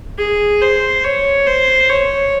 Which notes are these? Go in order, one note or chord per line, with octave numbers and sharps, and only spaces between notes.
G#4
C5
C#5
C5
C#5